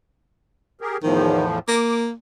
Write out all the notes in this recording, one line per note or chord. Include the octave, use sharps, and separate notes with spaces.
G4 G#4 A#4
E2 A2 D#3 F3
A#3 D6